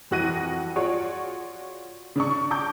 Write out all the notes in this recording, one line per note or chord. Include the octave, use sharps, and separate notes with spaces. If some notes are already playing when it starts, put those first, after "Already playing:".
F2 E3 F#4 F#6 A#6 D#7
F4 F#4 G#4 C#5 D5
C#3 D4 C#6
A5 A#5 D6 G6